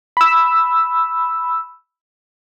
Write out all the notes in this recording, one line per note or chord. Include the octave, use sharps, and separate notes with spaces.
B5 E6